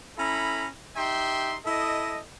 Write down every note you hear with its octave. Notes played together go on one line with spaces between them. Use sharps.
C#4 E4 A4 A#5 B5
D#4 G4 E5 G5 C6
E4 A4 D#5